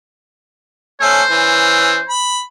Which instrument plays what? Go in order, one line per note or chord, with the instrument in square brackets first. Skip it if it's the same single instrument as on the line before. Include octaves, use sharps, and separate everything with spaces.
[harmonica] A3 C#4 [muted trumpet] C5
[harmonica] E3 C#4
B5